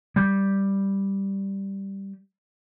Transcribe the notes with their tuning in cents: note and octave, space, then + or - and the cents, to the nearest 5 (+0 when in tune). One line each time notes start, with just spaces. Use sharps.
G3 +0